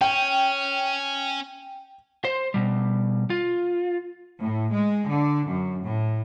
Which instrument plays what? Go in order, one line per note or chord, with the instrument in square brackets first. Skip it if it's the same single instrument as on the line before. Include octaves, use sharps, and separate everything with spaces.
[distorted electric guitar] C#4 [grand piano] G5
[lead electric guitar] C5 C6
B2 G3
F4
[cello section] A2
G#3
D3
F#2
A2